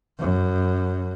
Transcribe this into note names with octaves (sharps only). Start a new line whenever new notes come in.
F#2